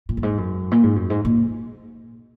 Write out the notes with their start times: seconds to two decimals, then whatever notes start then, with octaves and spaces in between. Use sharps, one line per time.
0.09 A#2
0.17 F#2
0.23 G#2
0.38 F#2
0.71 A#2
0.83 G#2
0.96 F#2
1.10 G#2
1.25 A#2